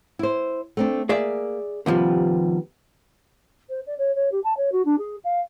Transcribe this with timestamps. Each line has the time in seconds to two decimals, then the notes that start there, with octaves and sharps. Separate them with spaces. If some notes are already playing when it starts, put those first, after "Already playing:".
0.19 E4 C5
0.77 A3 C4 D4
1.09 A#3 G#4 D5 E5
1.86 D#2 C3 F3 G3 B3
3.70 C5
3.87 D5
3.98 C#5
4.15 C#5
4.32 G4
4.44 A5
4.57 C#5
4.72 F#4
4.85 D4
4.99 G#4
5.24 F5